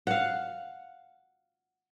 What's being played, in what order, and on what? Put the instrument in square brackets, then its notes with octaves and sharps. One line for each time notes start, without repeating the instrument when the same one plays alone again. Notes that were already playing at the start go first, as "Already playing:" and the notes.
[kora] F5 F#5